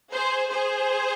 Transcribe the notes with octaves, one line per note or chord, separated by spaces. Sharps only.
G#4 C5
G#4 C5